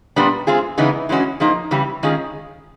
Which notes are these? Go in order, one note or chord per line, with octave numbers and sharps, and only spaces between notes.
A#2 G3 B3 D4
G#3 C4 F4 G#4
C#3 E3 G#3 B3 D#4
E3 G#3 C#4 F#4
F3 A#3 D#4 G#4
C#3 E3 G3
D#3 G#3 C#4 F4 G#4